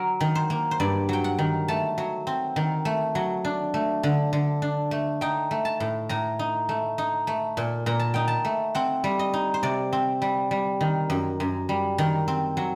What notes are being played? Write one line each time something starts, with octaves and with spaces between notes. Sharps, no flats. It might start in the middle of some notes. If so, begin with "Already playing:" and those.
Already playing: F#3 A#4
D#3
C5
A#3
C5
G2 D5
F#3 G5
F#5
D#3
A3 A5
F#3
C4
D#3
A3
F#3
D4
A3
D3
D3
D4
A3
D#4 G5
A3
A5
A2
A2 A#5
D#4
A3
D#4
A3
A#2
A#2 A#5
A5
D#4 G5
A5
A3
C4 F#5
G3
D#5
D#4
C5
C3 D5
C4
G3
G3
D#3
F#2
F#2
G3
D#3
C4
F#3